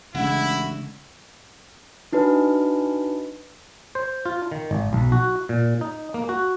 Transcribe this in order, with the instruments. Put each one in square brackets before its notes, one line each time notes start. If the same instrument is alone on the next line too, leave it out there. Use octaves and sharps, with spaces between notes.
[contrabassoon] A1 [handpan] C#3 G#3 D4 [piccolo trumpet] E4 [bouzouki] F#4
[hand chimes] D4 D#4 F#4 B4
[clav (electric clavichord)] C5
F4
D#3
G#1
B1
F#4
A#2
D#4
A#3
F#4